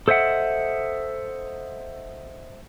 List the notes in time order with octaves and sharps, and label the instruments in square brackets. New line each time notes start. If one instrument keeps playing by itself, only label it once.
[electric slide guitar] A4 C5 D#5 E5 F#5